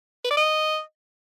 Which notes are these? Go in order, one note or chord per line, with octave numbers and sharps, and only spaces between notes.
B4
D5
D#5